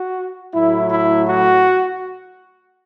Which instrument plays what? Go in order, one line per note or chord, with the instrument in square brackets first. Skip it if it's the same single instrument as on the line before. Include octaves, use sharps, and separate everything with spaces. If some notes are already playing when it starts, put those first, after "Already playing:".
Already playing: [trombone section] F#4
A2 F#3 A3 E4
E4
F#4